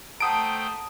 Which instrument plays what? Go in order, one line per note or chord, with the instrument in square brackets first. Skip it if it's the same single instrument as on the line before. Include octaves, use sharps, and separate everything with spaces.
[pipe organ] A3 C5 G5 [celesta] F#5 A5 A#5 [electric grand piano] D#6 D7